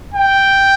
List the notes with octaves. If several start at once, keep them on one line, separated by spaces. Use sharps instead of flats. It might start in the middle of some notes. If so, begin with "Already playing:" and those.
G5